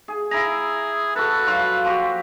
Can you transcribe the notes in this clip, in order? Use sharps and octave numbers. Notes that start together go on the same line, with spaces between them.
G#4
E4 G#4 A#5
F#4 A4 B4
F#3 F4 F5
F3 F#4 G4